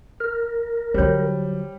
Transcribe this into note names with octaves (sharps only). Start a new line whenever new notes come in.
A#4
D3 F#3 G3 C5 C#5